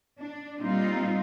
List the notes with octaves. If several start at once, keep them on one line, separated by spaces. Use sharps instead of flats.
D4
A#2 G3 C4 D#4 F4